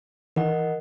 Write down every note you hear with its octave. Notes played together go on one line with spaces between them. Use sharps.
D#3 E3 A#4 D#5 F#5